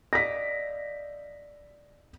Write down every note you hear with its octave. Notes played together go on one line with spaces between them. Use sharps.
D5 D#5 F5 A#6 B6